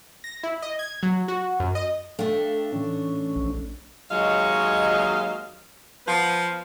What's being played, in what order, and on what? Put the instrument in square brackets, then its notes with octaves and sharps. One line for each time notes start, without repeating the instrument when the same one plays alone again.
[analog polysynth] A#6
E4
D#5
G#6
F#3
F#4
F#2
D#5
[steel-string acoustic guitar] A3 D4 [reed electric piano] A4 F5 G5
[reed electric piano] A2 E3 [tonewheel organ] C#4
[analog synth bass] A#1
[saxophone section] D#2 F#3 G#3 C#5 D#5 F5
F3 B3 B4